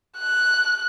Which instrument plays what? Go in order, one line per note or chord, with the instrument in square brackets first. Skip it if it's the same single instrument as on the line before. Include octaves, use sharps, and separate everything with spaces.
[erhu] F#6